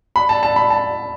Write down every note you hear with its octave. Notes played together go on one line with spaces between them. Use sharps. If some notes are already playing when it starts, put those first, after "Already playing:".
B5
A5
A5
B5
A5